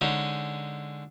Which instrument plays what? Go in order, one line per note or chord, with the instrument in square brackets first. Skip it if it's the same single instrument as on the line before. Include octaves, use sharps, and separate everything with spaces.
[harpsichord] D3 G#3 C#4 D#4